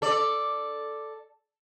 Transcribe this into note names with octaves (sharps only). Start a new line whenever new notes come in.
A4 D5